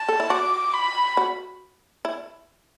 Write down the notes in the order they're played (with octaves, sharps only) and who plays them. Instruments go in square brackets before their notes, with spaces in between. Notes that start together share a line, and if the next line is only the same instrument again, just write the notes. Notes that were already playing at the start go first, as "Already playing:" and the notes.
Already playing: [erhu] A5
[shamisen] A4
E4
[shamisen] F#4 [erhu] D6
[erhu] B5
[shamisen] F#4
E4